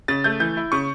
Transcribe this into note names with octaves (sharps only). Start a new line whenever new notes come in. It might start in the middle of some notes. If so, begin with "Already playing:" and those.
C#3 A6
A3 G6
E3 G6
E4
C#3 C#6